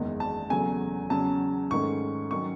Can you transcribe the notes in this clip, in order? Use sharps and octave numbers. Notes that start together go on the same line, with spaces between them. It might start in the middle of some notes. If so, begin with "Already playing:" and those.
Already playing: F#1 E2 D#3 G#3
A5
E1 E2 C#3 F#3 A3 G#5
E2 C#3 F#3 C#4 A5
G#2 D#3 A3 C#4 C#6
D#3 F#3 C#4 C#6